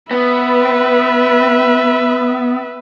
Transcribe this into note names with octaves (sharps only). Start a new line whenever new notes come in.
B3 B4 E5